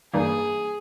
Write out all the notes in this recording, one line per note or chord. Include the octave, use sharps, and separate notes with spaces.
G2 E3 G3 A#3 D#4 G#4